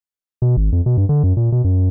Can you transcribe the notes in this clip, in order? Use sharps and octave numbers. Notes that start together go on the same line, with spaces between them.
B2
G#1
F2
B2
G2
D3
F#2
A#2
B2
F#2